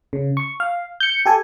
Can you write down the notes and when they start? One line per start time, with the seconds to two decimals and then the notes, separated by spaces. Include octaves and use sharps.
0.13 C#3
0.37 C#6
0.60 F5
1.00 G6 C#7
1.26 G4 A4 G#5